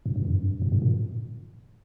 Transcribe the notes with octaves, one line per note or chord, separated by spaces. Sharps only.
G2
G2
F2
G2
G2
G#2
A#2